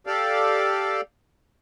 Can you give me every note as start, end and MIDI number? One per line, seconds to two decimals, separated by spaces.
0.07 1.01 67
0.07 1.01 69
0.07 1.01 74
0.07 1.01 77